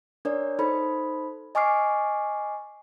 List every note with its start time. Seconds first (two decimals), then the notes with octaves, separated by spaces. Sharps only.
0.25 D4 A#4 C#5 D5
0.59 D#4 A4 C5 B5
1.55 D#5 G#5 C#6 D6 F6 C7